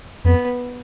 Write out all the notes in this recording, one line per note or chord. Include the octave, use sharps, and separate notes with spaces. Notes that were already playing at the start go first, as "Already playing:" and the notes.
F2 B3